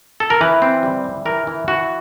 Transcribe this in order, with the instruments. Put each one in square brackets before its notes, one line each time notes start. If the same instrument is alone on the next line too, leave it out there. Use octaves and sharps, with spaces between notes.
[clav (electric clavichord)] A4
A#4
E3 B4
C4
G3
E3
E3 A#4
E3
E3 F#4